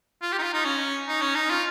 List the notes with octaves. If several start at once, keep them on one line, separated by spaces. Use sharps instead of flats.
F4
G4
D#4
F4
D#4
C#4
D#4
C#4
D#4
F4